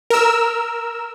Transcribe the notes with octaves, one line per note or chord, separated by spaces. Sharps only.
A#4 E6